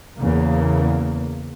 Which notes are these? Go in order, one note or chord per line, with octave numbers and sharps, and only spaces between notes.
E2 C#3 A#3